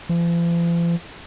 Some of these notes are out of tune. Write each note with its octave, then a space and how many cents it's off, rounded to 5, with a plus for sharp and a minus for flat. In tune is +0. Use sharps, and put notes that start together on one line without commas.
F3 -45